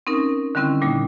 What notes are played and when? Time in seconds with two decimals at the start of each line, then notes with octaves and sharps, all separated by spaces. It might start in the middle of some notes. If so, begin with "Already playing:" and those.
0.07 C4 C#4 D#4 A#4
0.55 D3 D#3 G3 C4 C#4 E4
0.82 A#2 G3 A#3 D#4